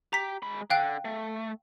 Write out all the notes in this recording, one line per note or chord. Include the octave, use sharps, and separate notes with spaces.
G4 A#5 B6
G#3 B5
D3 F5 G5 F#6
A3